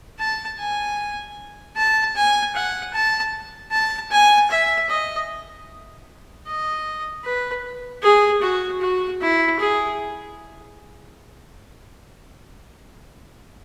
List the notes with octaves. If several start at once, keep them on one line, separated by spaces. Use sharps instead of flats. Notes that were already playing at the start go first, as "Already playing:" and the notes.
A5
G#5
A5
G#5
F#5
A5
A5
G#5
E5
D#5
D#5
B4
G#4
F#4
F#4
E4
G#4